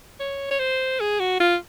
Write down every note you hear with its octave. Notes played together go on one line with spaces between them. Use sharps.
C#5
C#5
C5
G#4
F#4
F4